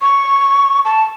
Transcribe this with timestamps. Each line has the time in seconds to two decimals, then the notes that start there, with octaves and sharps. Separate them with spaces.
0.02 C#6
0.85 A5